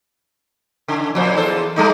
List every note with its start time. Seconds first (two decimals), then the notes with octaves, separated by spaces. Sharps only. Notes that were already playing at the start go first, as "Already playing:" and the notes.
0.88 C#3
1.15 F2 A#2 C5
1.37 E2 A4 C5
1.76 G3 A3 D#4